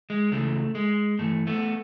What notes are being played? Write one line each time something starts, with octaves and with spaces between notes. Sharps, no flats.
G#3
C#2 C#3 E3 A3
G#3
G2 E3 A3
A3 B3